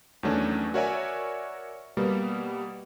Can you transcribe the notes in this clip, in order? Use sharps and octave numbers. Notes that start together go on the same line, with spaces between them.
E2 D#3 F#3 A3 C#4 D4
F#4 A#4 C#5 D5 E5 G#5
B2 G3 A#3 B3